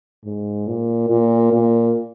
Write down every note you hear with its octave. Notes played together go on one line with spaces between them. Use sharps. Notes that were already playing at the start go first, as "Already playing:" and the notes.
G#2
A#2
A#2
A#2